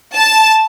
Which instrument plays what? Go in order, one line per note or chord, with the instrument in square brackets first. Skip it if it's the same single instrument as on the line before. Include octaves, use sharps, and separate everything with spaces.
[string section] A5